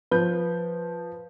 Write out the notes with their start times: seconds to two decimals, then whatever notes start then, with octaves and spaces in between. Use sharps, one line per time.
0.12 F3 B4 G6